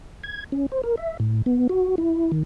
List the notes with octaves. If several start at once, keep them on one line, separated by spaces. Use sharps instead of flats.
G#6
C#4
C5
A#4
E5
A2
B3
F#4
E4
D#3